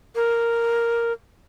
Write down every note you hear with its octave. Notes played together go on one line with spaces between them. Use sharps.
A#4